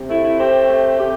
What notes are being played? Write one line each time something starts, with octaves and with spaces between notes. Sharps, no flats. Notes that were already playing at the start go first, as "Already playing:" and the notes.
Already playing: C3
A3 E4
E4
C4 G4
A3
C3 G4